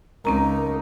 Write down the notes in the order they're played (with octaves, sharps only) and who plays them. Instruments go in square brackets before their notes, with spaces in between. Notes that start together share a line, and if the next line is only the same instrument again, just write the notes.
[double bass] C#2 D#4 [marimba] C4 C#4 A#5 [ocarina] A#4